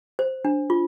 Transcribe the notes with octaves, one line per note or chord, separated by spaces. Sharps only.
C5
D4
F4